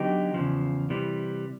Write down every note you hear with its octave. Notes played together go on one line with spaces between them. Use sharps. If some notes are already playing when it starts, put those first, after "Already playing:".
Already playing: D3 F#3 B3 D#4 G4
E2 C#3 F3
C3 E3 G3